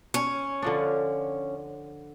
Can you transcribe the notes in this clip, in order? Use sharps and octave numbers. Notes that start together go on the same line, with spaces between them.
C#4
D3 F3 D4